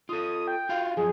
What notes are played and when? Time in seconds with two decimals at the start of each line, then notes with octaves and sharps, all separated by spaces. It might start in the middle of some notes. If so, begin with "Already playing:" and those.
0.09 F4 A4 D#6
0.48 G5
0.69 F4 F#4 F5
0.97 F#2 F3 G#4